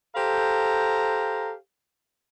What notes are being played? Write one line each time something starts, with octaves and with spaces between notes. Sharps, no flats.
G4 A4 C5 F5 A#5